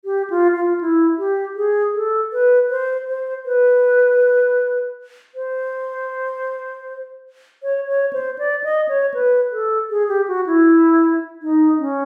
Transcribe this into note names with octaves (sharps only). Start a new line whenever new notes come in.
G4
F4
F4
E4
G4
G#4
A4
B4
C5
C5
B4
C5
C#5
C#5
C5
D5
D#5
C#5
B4
A4
G#4
G4
F#4
E4
D#4
C#4